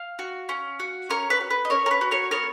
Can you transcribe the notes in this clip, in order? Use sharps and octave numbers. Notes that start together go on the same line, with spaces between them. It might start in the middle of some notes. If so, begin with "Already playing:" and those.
Already playing: F5
F#4
C#4
F#4
C#4 A#4 C#5
B4
F#4
B4
D#5
C#4 A#4 C#5
A#4
B4
F#4
A#4 C#5
B3 A#4 C#5